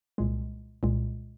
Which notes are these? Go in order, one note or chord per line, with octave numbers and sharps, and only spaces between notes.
C2 A#2 G#3
C2 A#2 G#3